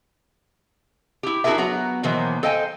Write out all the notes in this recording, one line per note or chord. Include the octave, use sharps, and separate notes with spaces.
E4 G4
D4 E4 F#4 G#4 A#4 E5
F#3 B3 F#4 A#5
B2 D#3 E3 F#3 A#3 C5
A4 C5 D#5 F5 G5 G#5